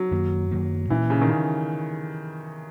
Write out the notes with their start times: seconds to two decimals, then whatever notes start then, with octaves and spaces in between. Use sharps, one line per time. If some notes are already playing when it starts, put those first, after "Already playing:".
Already playing: F#3
0.11 F#2 D#3 A#3
0.51 F#2 D#3 A#3
0.90 A#2 E3 A#3 C#4
1.10 C#3
1.22 D#3
1.29 C#3